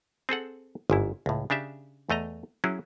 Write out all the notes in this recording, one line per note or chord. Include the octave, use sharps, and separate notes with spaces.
C4 G#4 A4 F#5
G1 G#2 E4
C#2 A2
C#3 D4 G4 E5
E2 A3 D#5 A#5
F#3 C#4 E4 G#4